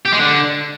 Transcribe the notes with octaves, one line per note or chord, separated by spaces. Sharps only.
G4
G#3
D3